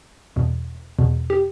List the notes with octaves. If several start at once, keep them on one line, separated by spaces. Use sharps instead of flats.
E2 B2
E2 B2
G4